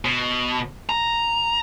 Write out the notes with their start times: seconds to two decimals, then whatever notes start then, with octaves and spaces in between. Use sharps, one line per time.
0.05 B2
0.89 A#5